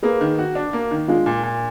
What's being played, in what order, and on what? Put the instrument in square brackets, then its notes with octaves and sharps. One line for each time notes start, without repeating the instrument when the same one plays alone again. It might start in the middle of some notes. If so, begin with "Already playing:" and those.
[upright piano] A#3 [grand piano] G#4 B4
[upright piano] D#3
F#4
D4
A#3
D#3
[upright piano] G#3 [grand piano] D4 F4
[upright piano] A#2
A#2